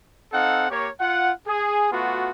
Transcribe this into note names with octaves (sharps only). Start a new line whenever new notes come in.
C4 D#4 A4 F5 F#5
A#3 G4 C#5
F4 F#5
G#4
A3 B3 F4 F#4